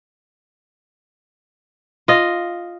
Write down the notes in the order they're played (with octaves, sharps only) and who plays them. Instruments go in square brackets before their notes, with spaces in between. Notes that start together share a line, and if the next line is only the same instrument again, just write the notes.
[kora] F4 D#5